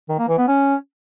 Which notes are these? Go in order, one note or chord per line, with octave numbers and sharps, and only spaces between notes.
D#3
A#3
E3
B3
C#4